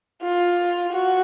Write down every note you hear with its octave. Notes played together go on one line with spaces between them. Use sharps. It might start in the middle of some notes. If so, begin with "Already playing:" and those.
F4
F#4